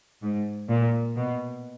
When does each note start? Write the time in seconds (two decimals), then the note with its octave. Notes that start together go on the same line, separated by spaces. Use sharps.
0.22 G#2
0.69 A#2
1.16 B2